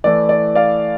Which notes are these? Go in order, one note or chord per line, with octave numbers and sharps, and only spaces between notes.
E3 A3 E4 D5
D5
D5 F5